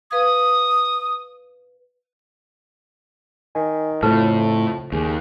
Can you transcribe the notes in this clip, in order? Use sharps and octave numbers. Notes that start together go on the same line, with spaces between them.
B4 F5 D#6 G#6
D#3 G#5
F2 A2 C#3 F4 A4 A5
D#2 G#4